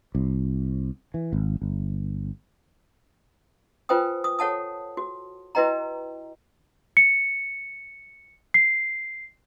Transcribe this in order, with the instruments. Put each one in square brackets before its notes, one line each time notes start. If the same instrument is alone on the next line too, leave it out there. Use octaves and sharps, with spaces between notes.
[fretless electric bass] C2
E3
G#1
G1
[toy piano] F4 B4 C5 G5 G#5 D#6
D#6
A4 C#5 F#5 A5 D#6
F#4
E4 F#4 B4 D#5 G5 A#5
[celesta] C#7
C7